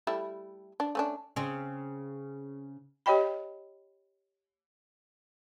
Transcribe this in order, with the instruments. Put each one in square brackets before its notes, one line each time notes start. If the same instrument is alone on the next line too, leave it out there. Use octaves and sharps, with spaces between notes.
[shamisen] G3 A3 E4
D4
A3 C#4 D4
[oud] C#3 C4 C#4
[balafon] G4 C#5 D#5 G5 B5